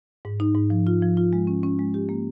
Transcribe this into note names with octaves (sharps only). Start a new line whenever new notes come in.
G#2
D#4
G#2
F3
F4
F3
F4
G#3
C#4
C#4
G#3
G4
A#3